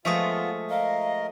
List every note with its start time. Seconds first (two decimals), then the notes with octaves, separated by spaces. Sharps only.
0.05 F3 G#3 A3 B3 F4 E5 C#6 D#6
0.70 A#4 D#5 F5